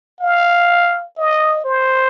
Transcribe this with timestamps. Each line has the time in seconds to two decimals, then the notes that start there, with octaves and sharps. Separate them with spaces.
0.20 F5
1.17 D#5
1.65 C5